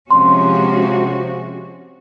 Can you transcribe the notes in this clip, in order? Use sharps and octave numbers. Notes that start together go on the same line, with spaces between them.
C3 F3 G#3 C#4 F#4 C6